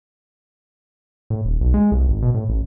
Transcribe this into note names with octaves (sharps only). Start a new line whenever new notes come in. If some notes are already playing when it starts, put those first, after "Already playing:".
A2
D#1
B1
G#3
C2
G#1
B2
A2
A1